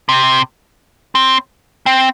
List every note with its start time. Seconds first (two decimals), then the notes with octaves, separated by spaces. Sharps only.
0.09 C3
1.15 C4
1.86 C4